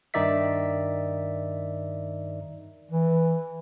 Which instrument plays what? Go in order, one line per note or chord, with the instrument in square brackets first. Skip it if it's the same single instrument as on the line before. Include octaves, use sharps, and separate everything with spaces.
[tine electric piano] G2 D#3 D#4 D5 E5 B6
[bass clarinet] E3